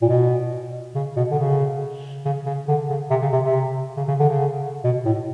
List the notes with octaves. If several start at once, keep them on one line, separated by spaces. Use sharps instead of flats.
A#2
B2
C#3
B2
D3
C#3
C#3
C#3
D3
C#3
C3
C#3
C3
C3
C#3
C#3
D3
C#3
B2
A2